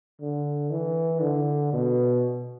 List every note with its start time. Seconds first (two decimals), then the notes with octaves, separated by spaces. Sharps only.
0.20 D3
0.70 E3
1.21 D3
1.73 B2